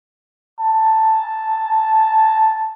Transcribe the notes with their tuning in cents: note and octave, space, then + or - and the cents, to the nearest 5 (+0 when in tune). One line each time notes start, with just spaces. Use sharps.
A5 +0